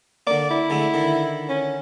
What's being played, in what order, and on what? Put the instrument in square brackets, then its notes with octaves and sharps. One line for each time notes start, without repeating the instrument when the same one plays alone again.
[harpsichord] D3 A#3 [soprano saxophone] D5
[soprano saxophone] E4
[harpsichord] D3 G#3 A3
D3 D#3
[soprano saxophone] C#4